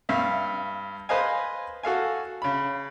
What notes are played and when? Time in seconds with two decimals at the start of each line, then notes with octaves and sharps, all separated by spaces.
0.09 G2 E5 F5
1.09 B4 C5 D#5 F5 G#5
1.83 F#4 A4 F5 G#5
2.42 C#3 B5